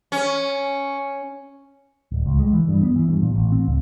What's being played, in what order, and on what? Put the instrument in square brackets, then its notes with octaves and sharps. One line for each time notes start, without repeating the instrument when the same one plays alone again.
[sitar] C#4
[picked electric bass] D1
C#2
G#3
E3
G2
B3
E3
G2
A#2
A1
C4
C#2